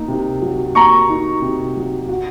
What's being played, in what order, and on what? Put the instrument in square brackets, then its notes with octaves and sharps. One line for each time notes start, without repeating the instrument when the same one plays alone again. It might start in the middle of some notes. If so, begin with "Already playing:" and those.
Already playing: [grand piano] A#3 D#4
C3
F#3
[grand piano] A#3 [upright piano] A#5 C#6
[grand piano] D#4
C3
F#3
F#4